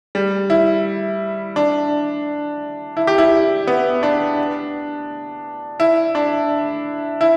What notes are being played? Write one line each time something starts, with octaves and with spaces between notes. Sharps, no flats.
G3
E4
D4
E4
G4
E4
B3
D4
E4
D4
E4